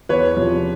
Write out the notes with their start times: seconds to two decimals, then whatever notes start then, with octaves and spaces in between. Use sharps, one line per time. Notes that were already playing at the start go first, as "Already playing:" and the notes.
0.09 E2 B4 C#5
0.37 C3 F3